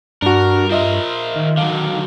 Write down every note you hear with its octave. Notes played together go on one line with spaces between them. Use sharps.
G2 D4 F#4 A#4
F4 A#4 C5 D#5 E5
D#3
D3 F#3 F5